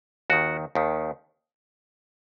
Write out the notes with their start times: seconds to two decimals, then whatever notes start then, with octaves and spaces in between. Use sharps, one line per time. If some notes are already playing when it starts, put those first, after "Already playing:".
0.30 D#2 D#3 F#4
0.75 D#2 D#3